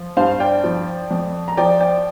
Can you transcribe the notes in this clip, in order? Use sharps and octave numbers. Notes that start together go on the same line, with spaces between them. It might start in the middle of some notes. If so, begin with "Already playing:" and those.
Already playing: F3
G2 C5 F5
D5 G5
F3
F2
A#5
F3 D5 G5
D5 G5